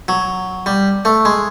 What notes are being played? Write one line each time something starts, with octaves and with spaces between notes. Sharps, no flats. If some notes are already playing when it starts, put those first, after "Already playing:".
F#3
G3
A3
G#3